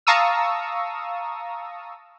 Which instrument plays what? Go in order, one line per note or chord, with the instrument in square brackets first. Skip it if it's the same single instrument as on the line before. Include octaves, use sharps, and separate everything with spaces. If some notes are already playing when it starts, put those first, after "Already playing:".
[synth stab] F5 A5 A#5 C#6 D#6 E6